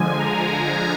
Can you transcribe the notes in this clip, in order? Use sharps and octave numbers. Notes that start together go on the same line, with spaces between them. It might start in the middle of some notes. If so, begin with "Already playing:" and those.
Already playing: D3 F3 G#3 G#5
G#5 A#5